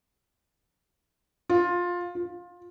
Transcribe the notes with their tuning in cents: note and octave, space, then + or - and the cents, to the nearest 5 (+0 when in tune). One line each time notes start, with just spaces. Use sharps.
F4 +15
F4 +20